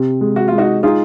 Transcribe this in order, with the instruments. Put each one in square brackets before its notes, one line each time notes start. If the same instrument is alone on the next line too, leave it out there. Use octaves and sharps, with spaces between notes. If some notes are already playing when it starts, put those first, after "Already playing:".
Already playing: [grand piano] C3
G#3
[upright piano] F#4
[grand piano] G#3 [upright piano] F4
[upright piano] D#4 F#4
[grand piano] D#4 [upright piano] F4 G#4